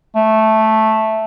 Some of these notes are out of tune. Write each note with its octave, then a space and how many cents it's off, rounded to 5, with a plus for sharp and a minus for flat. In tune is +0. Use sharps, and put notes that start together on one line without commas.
A3 -5